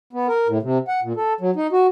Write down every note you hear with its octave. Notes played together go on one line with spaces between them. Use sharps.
B3
A#4
A2
C3
F#5
A#2
A4
F#3
D#4
F#4